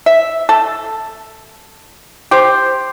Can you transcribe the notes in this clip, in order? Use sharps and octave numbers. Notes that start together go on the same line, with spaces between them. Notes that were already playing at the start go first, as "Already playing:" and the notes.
E5
A4
G4 C5